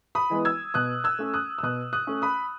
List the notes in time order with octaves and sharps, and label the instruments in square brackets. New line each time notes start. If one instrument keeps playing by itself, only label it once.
[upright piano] B5 D#6
E3 G#3 B3
E6 G#6
B2 D#6 F#6
E6 G#6
A3 C#4
D#6 F#6
E6
B2 D#6 F#6
D#6 F#6
A3 C#4
B5 D#6